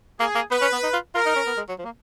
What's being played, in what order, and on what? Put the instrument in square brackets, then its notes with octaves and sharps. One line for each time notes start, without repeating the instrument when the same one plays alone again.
[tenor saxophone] A#3 [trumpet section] G#4
[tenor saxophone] A#3
[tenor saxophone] B3 [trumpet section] B4
[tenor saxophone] C#4
B3
D#4
F4
[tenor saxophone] F4 [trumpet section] A#4
[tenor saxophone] D#4
C#4
B3
G#3
F#3
F3
A#3